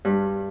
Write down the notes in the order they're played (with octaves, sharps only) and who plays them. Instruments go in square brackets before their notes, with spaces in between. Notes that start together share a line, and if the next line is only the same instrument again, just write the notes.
[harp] G2